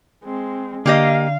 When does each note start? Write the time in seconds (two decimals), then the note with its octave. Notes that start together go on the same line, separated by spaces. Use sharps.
0.24 G#3 C4
0.86 D3 A#3 G4 D#5 F5